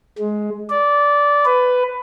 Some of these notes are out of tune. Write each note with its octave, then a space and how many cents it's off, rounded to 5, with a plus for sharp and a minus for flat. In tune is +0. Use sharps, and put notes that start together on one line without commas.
G#3 +15
D5 -15
B4 +15